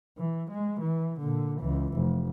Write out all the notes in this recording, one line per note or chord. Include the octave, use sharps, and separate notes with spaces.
E3
G#3
E3
A#2 D3
C#2 E3
F1